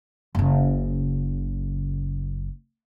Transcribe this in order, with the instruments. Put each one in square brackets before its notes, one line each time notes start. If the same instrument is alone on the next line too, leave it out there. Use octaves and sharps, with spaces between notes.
[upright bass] F#1 C#3